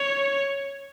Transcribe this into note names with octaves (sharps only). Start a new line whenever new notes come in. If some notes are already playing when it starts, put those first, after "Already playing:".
Already playing: C#5